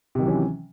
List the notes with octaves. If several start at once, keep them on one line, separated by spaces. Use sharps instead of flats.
C3 D#3 E3 F#3 C#4